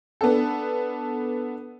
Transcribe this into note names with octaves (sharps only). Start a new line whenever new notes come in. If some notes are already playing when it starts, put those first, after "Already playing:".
B3 D4 A4